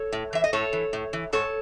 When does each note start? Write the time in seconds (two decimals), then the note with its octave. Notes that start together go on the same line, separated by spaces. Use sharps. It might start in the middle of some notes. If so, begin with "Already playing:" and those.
Already playing: A4 C#5
0.13 A2
0.33 E3 E5
0.44 D#5
0.53 A2 A4 C#5
0.73 E3
0.93 A2
1.13 E3
1.33 G#2 A4 C#5